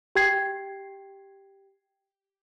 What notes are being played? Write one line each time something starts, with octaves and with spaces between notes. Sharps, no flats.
G4 G5 G#6 C7